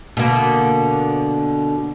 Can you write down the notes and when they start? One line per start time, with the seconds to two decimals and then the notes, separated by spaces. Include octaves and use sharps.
0.17 B2 D3 A#3